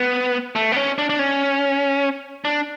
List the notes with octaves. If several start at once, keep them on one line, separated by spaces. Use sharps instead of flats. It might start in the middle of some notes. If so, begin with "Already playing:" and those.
Already playing: B3
A3
B3
C#4
D4
D4
C#4
D4